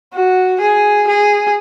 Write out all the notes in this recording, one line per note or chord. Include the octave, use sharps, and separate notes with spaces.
F#4
G#4
G#4